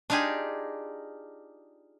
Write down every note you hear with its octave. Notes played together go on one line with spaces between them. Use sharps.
D4 D#4 F4 G4 G#4